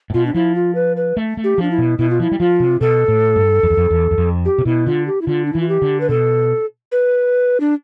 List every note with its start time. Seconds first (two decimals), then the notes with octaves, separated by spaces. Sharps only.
0.10 A2
0.14 B2 F4
0.26 D4
0.34 F3 E4
0.55 F4
0.75 B4
0.96 B4
1.17 A3
1.37 A3
1.44 G4
1.58 F3 D4
1.71 E4
1.78 B2
1.98 B2 E4
2.10 F4
2.20 F3 E4
2.32 G3
2.39 F3 F4
2.60 C3
2.81 B2 A4
3.08 A2
3.36 G2
3.63 F2
3.70 E2
3.77 F2
3.90 E2
4.11 E2
4.18 F2
4.45 G4
4.58 C3
4.65 B2 E4
4.86 D3 F4
5.07 G4
5.21 E4
5.27 D3 F4
5.45 D4
5.53 E3 E4
5.61 F4
5.69 G4
5.82 D3
6.00 B4
6.09 B2 A4
6.92 B4
7.60 D4